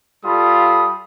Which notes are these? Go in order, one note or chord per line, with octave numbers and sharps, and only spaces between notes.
G3 F4 A4 F5 B5 D#6